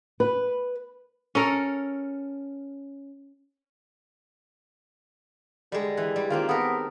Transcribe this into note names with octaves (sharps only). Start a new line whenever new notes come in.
B4
C#4 A4 A#4
D3 G3 G#3
E3
G3
D#3 A#3 C4 F4
B3 A4 A#4